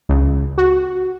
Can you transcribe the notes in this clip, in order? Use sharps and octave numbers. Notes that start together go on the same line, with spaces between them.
C#2
F#4